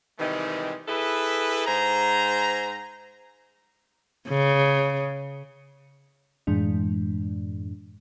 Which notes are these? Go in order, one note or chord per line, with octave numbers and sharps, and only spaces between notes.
C3 D#3 E3 G3 G#3
E4 G#4 A4 B4
G#2 C5 G#5 A#5
C#3
F#2 A2 E3 G#3 D4